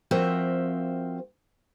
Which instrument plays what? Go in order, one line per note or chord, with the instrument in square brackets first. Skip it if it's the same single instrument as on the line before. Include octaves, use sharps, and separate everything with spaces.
[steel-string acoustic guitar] F3 C4 F#4 A#4 C5 E5